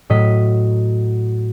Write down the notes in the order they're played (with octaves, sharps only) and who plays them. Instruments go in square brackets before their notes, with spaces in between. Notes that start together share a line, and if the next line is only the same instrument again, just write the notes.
[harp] A2 F#3 D#5 B6